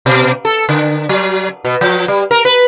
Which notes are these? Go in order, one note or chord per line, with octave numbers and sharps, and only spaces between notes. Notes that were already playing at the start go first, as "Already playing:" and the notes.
B2
A4
D3
F#3
B2
F3
G3
A#4
B4